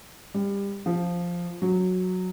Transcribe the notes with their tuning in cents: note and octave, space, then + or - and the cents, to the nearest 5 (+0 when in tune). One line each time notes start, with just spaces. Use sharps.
G3 +25
F3 +0
F#3 -10